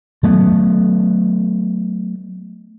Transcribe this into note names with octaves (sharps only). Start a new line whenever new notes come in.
F#3 A3 B3